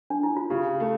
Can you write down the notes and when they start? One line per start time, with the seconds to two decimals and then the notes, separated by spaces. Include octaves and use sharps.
0.10 D4
0.23 E4
0.37 F4
0.50 C#3 G4
0.80 A3